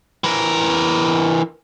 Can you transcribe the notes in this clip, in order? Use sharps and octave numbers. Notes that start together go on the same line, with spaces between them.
E3 A#4